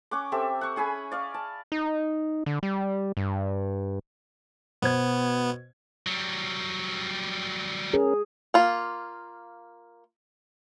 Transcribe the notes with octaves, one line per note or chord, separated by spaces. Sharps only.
C#4 F#5 C#6 D6
C4 G4 A4 E5
F#5 C#6
C#4 G#4 G#5 B5
D5 F5 C#6
A5
D#4
D3
G3
G2
B2 B3 C5 G#6
F#3 G3
C#4 G#4 A#4
A#3 F4